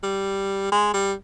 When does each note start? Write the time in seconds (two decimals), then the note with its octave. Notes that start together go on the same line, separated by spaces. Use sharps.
0.03 G3
0.72 G#3
0.94 G3